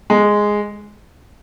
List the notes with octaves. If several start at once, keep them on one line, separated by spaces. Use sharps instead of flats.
G#3